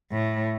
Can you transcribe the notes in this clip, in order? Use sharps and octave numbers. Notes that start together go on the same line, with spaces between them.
A2